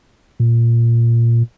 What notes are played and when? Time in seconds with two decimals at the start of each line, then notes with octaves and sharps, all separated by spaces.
0.40 A#2